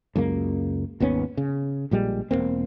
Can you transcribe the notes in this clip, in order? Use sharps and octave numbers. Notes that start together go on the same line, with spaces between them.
C#2 F#2 C#3 A#3
G#1 D#2 B3 C#4
C#3
A#1 A#2 G3 G#3
E1 A2 A#3 C4